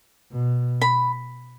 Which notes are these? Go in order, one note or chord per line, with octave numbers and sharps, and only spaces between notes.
B2
B5